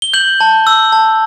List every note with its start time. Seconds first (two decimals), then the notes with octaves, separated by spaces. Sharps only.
0.02 G7
0.14 G6 F#7
0.40 A5
0.67 E6
0.92 A5